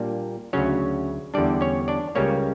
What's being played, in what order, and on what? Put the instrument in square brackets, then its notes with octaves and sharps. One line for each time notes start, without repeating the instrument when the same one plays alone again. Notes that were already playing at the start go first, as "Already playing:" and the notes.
Already playing: [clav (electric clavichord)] A#2 G3 A#3 D4 D5
D2 C#3 F#3 C#4 C#5
E2 D3 G3 D4 D5
C#4 C#5
D4 D5
C#2 C#3 G3 A#3 C#4 C#5